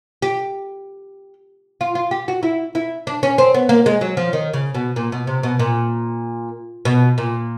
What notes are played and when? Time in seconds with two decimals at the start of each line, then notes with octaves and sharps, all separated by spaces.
0.22 G4
1.81 F4
1.95 F4
2.11 G4
2.28 F#4
2.43 E4
2.75 E4
3.07 D4
3.23 C#4
3.38 C4
3.54 B3
3.69 A#3
3.86 G#3
4.01 F#3
4.17 F3
4.33 D#3
4.53 C#3
4.75 B2
4.96 A#2
5.12 B2
5.27 C3
5.43 B2
5.59 A#2
6.85 B2
7.18 A#2